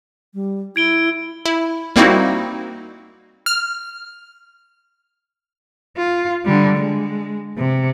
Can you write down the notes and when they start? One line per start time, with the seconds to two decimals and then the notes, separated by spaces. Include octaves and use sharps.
0.34 G3
0.76 E4 G#6 D7 G7
1.45 E4
1.96 G3 A#3 C4 D#4 E4 F#4
3.46 F6
5.97 F4
6.45 D3 G3
6.77 G#3
7.58 C3